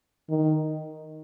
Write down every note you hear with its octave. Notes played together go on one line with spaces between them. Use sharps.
D#3